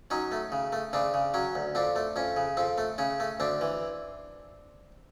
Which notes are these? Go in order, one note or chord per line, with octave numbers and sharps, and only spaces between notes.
F#3 C#4 D#4
A3
C#3
A3
C#3 C4 D4
C#3
F#3 C#4
D2
F2 C4 D4
A3
F2 C#4
C#3
F2 C4
A3
C#3 C#4
A3
D2 C4 D4
E3